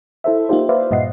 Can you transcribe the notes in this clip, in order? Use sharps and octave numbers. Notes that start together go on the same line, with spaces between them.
E4 A4 C5 E5
A#3 D#4 F4 G4 C5
B4 C5 D5 E5 F5
G2 A#2 D#5 F#5 C7